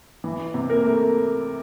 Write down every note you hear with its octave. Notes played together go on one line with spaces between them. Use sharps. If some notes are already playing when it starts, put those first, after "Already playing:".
E3
C3
A#3 A#4
A3